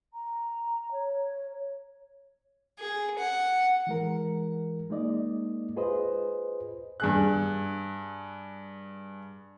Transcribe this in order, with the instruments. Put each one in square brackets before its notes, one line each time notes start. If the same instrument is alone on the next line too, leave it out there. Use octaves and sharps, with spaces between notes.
[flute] A#5
C#5
[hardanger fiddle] G#4
F#5
[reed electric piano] E3 G#3 A#4
G#3 A#3 D#4 D5 D#5
F4 G#4 B4 C5 D#5
[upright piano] G2 G#4 F#6